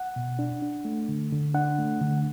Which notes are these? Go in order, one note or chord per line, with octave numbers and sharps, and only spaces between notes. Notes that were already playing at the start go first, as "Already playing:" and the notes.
Already playing: F#5
B2
D4
D4
A3
D3
D3
D4 F#5
A3
D3